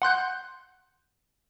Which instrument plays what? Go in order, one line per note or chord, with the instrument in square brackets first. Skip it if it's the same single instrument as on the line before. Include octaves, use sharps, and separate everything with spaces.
[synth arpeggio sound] F#5 C6 F#6 G6